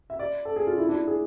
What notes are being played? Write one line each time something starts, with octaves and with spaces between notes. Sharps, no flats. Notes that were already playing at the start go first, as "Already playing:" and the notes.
E5
D5
A4
G#4
F4
E4
D4
E4
G#4